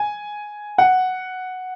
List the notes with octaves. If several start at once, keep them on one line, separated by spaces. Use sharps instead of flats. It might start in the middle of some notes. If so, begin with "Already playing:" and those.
Already playing: G#5
F#5